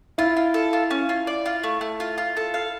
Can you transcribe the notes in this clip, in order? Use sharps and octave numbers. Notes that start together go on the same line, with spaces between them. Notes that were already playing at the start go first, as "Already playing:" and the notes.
E4 F4
F4
A4
F4
C#4
F4
D5
F4
A3
A3
F4
F4
A4
F5